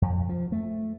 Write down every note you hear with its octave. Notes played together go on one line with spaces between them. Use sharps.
F2
F3
A3